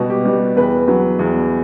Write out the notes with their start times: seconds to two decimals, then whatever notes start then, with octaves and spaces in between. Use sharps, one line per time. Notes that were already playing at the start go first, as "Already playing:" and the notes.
Already playing: B2 G3 F#4
0.10 G4
0.25 G3
0.56 E2 B4
0.88 F#3
1.19 E2